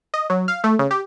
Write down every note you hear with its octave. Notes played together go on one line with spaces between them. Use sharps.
D#5
F#3
F5
A3
C#3
G4